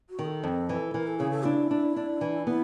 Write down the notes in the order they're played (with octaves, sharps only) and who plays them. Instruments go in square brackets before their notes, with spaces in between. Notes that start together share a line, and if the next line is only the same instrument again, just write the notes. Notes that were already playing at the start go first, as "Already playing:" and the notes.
[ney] F#4
[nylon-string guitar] D#3
[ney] A4
[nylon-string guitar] F2
E3
[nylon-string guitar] E3 [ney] A#4
[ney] A4
[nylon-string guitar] C#3 [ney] G#4
[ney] A4
[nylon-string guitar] D4 [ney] E4
[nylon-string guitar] D4
D4
E3
[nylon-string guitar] B3 [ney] E4